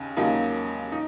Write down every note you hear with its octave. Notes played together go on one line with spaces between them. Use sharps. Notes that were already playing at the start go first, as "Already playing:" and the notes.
Already playing: D#2 C#3
D#2 C#3 F#3 A#3 D#4
D#4